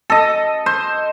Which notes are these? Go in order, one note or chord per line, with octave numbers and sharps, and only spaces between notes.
A4 D#5
C5